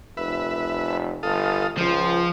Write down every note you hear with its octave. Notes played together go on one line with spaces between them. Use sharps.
F1 B4 E5
G1 A4 F5 D#6
C#2 F3 C5